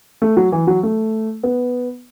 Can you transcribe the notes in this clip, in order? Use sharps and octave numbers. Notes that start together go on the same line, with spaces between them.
A3
F#3
E3
F#3
A3
B3